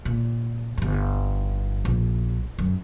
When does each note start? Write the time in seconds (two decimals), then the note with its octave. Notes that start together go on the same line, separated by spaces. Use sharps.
0.05 A#2
0.78 G1 G2
1.85 A#1
2.58 F#2